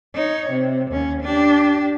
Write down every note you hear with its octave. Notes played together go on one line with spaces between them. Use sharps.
D#4 C#5
C3
D#2 C#4
D4 G4